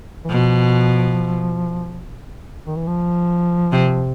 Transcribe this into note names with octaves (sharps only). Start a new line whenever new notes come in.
E3
B2 F3
D#3
E3
F3
C3